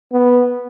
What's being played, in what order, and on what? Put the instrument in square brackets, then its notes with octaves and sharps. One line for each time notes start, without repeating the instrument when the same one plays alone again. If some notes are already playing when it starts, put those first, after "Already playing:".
[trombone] B3